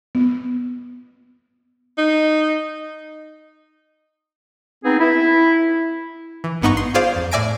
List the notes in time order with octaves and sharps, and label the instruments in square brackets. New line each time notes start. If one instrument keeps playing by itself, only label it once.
[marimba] B3
[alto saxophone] D#4
[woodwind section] B3 C4 D#4 G#4
E4
[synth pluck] E3
G#1 G2 B3 D#4 F#5 C#6
C6
F4 G#4 C5 D5 F5
F2
A2 D5 E5 G#5 A#6 D7